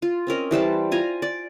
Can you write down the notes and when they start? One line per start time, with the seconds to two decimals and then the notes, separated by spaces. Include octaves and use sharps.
0.02 F4
0.27 C4 C#4 A#4 D#5
0.51 E3 G3 C5 A5
0.92 F4 G#5 A#5
1.22 D5